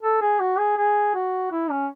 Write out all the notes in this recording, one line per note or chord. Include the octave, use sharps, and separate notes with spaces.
A4
G#4
F#4
G#4
G#4
F#4
E4
C#4